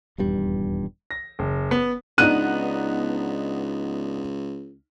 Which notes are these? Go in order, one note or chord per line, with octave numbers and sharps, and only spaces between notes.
D#1 E2 G2 G3
A#6
F#1
B3
C#2 B3 D4 D#4 F#6 D#7